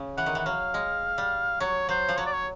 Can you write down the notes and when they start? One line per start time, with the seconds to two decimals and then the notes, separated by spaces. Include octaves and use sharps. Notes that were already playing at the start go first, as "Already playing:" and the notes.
Already playing: C#3
0.17 E3 F#5
0.26 D#3
0.35 E3 F#5
0.46 F#3 F5
0.74 G#3
1.18 G3
1.60 F#3 C#5
1.89 F#3 C5
2.09 F3
2.18 F#3 C#5
2.26 D5
2.34 C#5